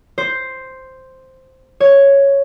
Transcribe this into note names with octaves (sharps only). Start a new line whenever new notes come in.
C5
C#5